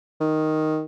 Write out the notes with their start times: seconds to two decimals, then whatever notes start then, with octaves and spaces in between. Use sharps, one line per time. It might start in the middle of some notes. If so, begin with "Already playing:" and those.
0.20 D#3